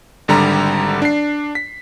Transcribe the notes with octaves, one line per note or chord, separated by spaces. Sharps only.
G#1 D3 G3 G4 A#5
D4 C7
B6